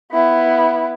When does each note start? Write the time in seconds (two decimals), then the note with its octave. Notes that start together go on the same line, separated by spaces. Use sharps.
0.12 B3 E4